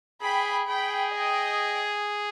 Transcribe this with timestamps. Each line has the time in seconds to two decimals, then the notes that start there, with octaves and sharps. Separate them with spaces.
0.22 G#4 G5 B5
0.67 G#4 G5 B5
1.13 D#5 G5